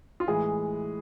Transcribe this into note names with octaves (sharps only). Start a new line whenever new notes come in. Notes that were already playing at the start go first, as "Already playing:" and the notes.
F4
A2 E3 G#3 G#4